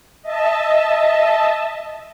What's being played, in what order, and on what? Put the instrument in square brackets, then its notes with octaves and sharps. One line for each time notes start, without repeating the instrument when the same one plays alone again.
[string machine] D#5 E5 A5